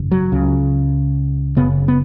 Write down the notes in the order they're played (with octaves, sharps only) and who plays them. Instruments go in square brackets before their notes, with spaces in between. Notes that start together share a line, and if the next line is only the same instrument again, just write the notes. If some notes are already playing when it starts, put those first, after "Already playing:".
Already playing: [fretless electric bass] G#1 F#2 C#3
F#3
C#2 C#3
F#1 F#2 C#3 B3
B3